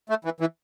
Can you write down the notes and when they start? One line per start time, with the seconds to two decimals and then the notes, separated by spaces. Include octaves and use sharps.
0.09 A3
0.25 E3
0.40 E3